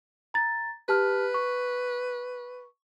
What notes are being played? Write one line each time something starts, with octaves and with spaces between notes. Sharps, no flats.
A#5 A6
G4 B4 A5 F6
C#6